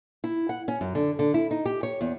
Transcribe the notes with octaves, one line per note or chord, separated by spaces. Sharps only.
E4
F#5
C#4
F#2
D3
D3
E4
D#4
G4
C#5
E2